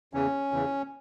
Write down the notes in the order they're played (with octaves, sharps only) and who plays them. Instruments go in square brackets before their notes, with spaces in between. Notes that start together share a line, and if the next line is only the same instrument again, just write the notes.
[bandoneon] E2 C#3 E3 C#4
E2 C#3 E3